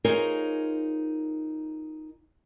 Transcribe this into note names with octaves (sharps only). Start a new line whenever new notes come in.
D#4 F4 G#4 A#4 C5 C#5